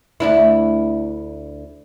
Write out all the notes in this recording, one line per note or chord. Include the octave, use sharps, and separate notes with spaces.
D2 D4 E4